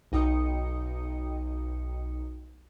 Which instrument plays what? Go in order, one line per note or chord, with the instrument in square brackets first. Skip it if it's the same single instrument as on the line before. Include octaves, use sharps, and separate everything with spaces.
[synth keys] B1 D#4 G5 D#6 C#7